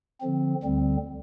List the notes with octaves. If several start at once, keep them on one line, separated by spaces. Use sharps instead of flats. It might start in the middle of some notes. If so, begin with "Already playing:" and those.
D3 F3 C4
D2 D3 G3 C4